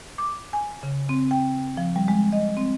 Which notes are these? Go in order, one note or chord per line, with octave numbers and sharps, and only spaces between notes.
D6
G#5
C#3
C4
G5
F3
G3
G#3
D#5
C4